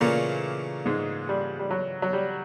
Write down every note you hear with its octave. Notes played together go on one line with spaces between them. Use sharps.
A#2 C#3 E3 A3 A#3 C#4 F4
G#2 G#3
G3
G3
F#3
F#3
G3